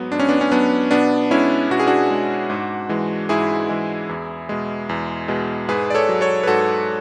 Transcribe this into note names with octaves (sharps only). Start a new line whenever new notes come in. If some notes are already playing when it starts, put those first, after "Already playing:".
Already playing: G#2 F#3 B3
G#2 D4
C#4
B3 D4
C#4
F#3 B3 D4
B2 B3 D4
G#3 C#4 E4
B2 F#4
G#4
D4 F#4
G#3
G#2
E3 G#3
G#2 E4 G#4
E3 G#3
E2
B2 G#3
E2
B2 G#3
G#2 G#4 B4
D5
A4 C#5
F#3
A4 C#5
B4
G#2 F#4 A4